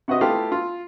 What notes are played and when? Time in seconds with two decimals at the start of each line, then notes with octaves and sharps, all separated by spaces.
0.08 C3 F#4 B4 D#5 D#6
0.21 A3 E4 F4 G4 B4 F5
0.52 F4